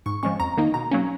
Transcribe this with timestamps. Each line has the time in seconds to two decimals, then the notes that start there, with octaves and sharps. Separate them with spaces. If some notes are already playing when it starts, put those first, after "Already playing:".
0.06 G#2 C#6
0.23 F3 G#3 C#4 C#6
0.40 F2 A#5
0.57 D#3 A#3 D#4
0.74 B2 A#5
0.91 F#3 A#3 C#4